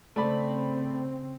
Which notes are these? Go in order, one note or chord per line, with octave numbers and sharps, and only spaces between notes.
C#3 A3 C4 D5 B5